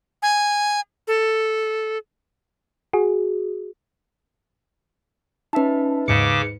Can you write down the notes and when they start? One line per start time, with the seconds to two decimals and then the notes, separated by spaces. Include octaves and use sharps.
0.22 G#5
1.08 A4
2.93 F#4 G#4
5.53 C#4 D#4 B4 E5 A5
6.08 D#2 G#2 C#3 D6 C#7